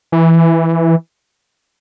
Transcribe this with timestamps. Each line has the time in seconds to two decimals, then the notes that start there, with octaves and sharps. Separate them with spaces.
0.12 E3